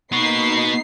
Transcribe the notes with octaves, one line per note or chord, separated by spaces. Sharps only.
A#3 B3 D#4 F#4 C7